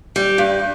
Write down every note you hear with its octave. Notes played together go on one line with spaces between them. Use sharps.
G3
G2